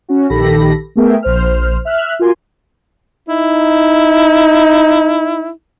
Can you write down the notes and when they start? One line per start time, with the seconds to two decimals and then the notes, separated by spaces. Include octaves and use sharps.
0.09 C#4 F#4
0.30 A#1 D#3 G4 A4 B5 A#6
0.96 A3 B3 G#4 A#4 E5 G5
1.22 A#1 C5 F6
1.85 E5 F6 F#6
2.19 F4 F#4 A#4 G#5 C6
3.29 D#4 E4